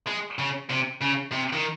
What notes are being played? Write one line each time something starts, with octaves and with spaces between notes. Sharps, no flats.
G#3
C#3
C3
C#3
C3
D#3